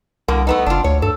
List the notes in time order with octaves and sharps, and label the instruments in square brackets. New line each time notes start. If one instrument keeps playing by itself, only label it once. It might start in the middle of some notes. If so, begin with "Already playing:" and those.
[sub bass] C2 [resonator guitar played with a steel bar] B2 D3 A#3
[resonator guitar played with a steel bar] A3 B3 D#4
[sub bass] F#1 [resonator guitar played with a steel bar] D4 F4
[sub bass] D2 [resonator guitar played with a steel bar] C#5
[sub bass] G2 [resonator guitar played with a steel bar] A4